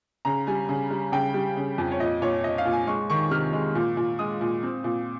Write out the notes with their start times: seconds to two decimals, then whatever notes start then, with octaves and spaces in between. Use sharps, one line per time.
0.25 C#3 A#5
0.47 G3 G#5
0.69 C#3
0.91 G3
1.12 C#3 G5
1.34 G3
1.57 C#3
1.78 F2
1.91 C#5
2.00 A#2 D#5
2.22 A#2 C#5
2.44 A#2 D#5
2.58 F5
2.65 A#2
2.72 G#5
2.87 G#3 C#6
3.10 D#3 C#6
3.31 C3 F6
3.53 G#3
3.75 A#2
3.97 A#2
4.19 G#3 D#6
4.41 A#2
4.63 C4
4.84 A#2